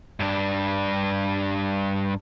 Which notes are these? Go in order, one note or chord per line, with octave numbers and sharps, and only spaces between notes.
G2 D4